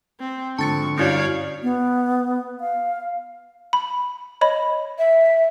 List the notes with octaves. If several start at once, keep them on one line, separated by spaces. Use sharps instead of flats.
C4
G#2 D3 F3 A5 C#6 A6 C#7
G2 C#4 E4 F#4 C#5 D5 F5 G#6
B3
F5
B5
C#5 D#5 B5
E5